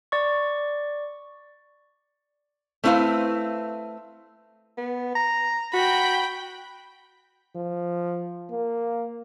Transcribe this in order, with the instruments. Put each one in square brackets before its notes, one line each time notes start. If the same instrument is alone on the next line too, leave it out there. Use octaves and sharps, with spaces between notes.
[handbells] D5 C#6
[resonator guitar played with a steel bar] A3 C4 E4 B4 F5
[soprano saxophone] B3
A#5
[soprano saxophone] F#4 [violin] G5 B5
[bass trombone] F3
A#3